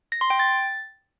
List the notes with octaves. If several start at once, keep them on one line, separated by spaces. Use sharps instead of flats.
A#6
C6
G5
A6